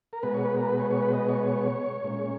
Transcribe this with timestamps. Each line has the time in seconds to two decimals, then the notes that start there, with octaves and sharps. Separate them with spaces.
0.13 A#4
0.23 B2 G#3 B3 B4
0.34 C#5
0.45 B4
0.57 A#4
0.68 B4
0.79 C#5
0.91 C#5
1.02 B4
1.13 D#5
1.29 C#5
1.43 C#5
2.04 A#2 G#3 C#4